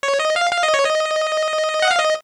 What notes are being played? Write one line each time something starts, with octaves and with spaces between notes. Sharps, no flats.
C#5
D#5
F5
F5
D#5
C#5
D#5
F#5
F5
D#5